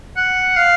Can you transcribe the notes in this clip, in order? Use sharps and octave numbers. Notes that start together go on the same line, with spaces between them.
F#5
F5